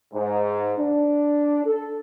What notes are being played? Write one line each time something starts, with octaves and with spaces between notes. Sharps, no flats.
G#2
D4
A4